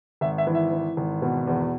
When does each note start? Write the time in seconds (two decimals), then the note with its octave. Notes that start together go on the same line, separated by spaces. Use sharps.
0.21 G#1 E5
0.38 E5
0.47 E3
0.55 E5
0.72 E3
0.97 G#1
1.22 B2
1.47 E2